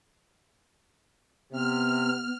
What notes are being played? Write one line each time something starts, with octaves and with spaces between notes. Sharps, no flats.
C3 B3 F6